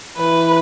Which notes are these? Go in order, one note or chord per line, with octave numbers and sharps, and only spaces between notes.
E3 B4